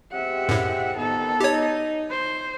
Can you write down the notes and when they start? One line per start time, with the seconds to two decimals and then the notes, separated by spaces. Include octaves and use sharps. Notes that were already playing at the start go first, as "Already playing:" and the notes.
0.12 G#3 C4 G4 E5 F#5
0.49 F#2 A2
0.96 F2 D#3 B3 A4
1.40 D#4 G4 C#5
2.10 C5